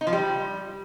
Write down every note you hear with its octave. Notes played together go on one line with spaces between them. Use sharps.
D#4
F3
G3